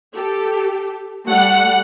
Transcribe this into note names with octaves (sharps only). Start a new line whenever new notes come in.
G4 A4
G3 A3 F#5